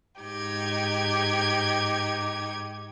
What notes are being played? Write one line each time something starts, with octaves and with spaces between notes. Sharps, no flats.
G#2 D#4 G4 G#6